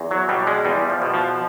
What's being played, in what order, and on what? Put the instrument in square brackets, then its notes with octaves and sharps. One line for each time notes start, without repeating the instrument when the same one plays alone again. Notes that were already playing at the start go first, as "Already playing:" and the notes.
Already playing: [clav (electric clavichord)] E2
F#3
B2 G3
G#3
E2 G3
F3
B2
F3